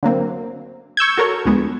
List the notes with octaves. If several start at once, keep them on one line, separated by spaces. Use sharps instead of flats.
D3 F#3 A#3 C4
C#6 E6 G6 G#6
F#4 A4 A#4 C#5
D2 F3 G#3 B3